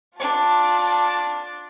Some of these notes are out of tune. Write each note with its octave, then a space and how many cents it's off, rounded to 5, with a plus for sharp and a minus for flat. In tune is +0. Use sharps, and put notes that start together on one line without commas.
D4 +0 F4 +25 A5 +0